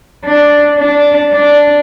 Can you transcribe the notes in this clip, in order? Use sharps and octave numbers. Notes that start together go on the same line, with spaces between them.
D4
D4
D4